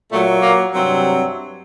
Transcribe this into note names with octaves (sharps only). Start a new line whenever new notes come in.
A#2 F#3 A3
A#2 A#3
G2 C3 F#3 C4